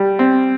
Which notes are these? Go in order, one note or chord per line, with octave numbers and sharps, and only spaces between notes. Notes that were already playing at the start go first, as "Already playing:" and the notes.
Already playing: G3
C4